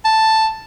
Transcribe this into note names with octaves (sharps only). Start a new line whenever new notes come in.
A5